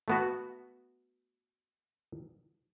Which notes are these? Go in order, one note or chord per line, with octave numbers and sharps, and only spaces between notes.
A3 B3 F#4